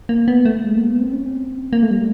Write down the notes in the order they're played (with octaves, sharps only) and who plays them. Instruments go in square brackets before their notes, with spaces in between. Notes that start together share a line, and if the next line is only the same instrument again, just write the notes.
[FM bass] A#3
B3
A3
G#3
A#3
B3
C4
C#4
C4
A#3
A3
G3